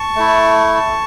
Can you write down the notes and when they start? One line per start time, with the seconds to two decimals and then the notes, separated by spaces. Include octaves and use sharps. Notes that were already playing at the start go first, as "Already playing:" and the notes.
Already playing: A5 C#6
0.16 A3 E4